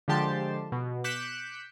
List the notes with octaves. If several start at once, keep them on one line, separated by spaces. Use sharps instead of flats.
D3 F3 G#3 G4 A5 C6
B2
D6 F#6 G6 B6 C#7 E7